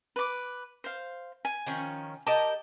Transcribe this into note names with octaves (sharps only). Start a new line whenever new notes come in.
B4 D6
C5 F5
G#5
D#3 F3 C#4
G4 A#4 D#5 A5